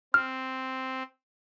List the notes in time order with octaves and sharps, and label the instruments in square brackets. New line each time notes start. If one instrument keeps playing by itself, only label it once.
[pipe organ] C4 [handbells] F6